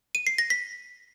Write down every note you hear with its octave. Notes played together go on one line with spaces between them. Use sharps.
D#7
C7
A#6
B6